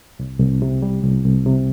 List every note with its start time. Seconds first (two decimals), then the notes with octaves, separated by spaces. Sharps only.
0.19 C2
0.40 C2
0.62 C3
0.82 G3
1.03 C2
1.25 C2
1.46 C3